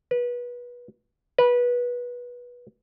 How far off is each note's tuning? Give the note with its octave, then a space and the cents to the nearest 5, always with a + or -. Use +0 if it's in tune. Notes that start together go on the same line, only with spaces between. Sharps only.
B4 -25
B4 -20